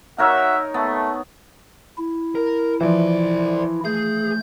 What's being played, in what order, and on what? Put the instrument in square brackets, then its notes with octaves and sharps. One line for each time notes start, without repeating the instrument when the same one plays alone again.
[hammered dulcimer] D#4 A#4 C#5 [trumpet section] F#4 E5
[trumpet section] A3 [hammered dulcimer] B3
[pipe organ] E4
[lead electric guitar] A#4
[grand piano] E3 F3 [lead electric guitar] C5 D5
[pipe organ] A3 G6 [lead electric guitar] G#4